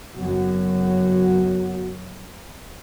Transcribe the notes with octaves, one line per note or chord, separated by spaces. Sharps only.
F#1 F#2 F#3 B3 F#4